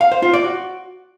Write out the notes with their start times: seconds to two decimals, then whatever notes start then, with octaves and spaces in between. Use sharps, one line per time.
0.01 F5
0.12 C5
0.23 F4
0.34 D5
0.44 F#4